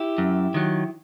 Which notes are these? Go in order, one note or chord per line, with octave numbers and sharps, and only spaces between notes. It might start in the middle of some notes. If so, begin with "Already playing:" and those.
Already playing: E4 G4
F#2
D#3 F#3